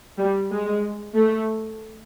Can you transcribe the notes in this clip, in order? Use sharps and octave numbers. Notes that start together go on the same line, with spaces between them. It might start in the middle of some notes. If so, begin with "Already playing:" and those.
G3
G#3
A3